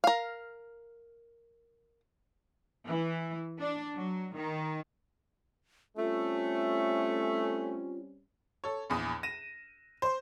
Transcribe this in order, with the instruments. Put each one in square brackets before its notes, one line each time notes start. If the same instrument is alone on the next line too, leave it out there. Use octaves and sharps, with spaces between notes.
[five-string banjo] A#4 F5
[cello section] E3
D4
F#3
D#3
[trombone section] G3 C4 C#4 [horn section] A3 [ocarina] F4
[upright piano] A4 C#5
A#1 E2 D#6
A#6 D#7 E7
C5 C6